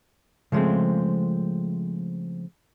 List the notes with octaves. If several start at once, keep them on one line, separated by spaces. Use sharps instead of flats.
C#3 F3 G#3 A3 C4